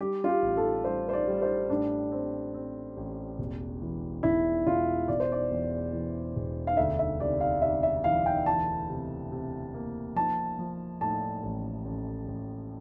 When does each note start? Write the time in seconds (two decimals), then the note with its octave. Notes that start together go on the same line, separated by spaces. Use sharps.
0.01 G3 G4
0.24 F4
0.29 G4
0.42 A1
0.57 A4
0.84 G3 C5
1.09 C5
1.13 D5
1.28 G3
1.42 C5
1.70 A2 D4
2.12 C4
2.54 C4
2.97 A1
3.38 E1
3.82 E3
4.23 E1 E4
4.66 E1 F4
5.08 E1 D5
5.20 C5
5.32 D5
5.50 E2
5.93 E3
6.36 E1
6.67 F5
6.77 D2 E5
6.99 E5
7.20 C3 D5
7.41 F5
7.62 C3 E5
7.83 E5
8.04 E3 F5
8.26 G5
8.46 E3 A5
8.89 C3
9.32 C3
9.74 A#3
10.16 F3 A5
10.59 F3
11.01 A2 A5
11.43 A1
11.85 A1
12.28 A1